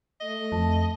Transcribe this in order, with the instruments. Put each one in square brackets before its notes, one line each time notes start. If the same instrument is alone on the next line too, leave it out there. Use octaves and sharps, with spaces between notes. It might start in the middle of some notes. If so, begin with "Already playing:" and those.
[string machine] A3 [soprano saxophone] D#5
[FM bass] F2 [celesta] A5